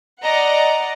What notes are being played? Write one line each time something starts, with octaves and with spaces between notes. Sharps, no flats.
D5 D#5 F#5 A#5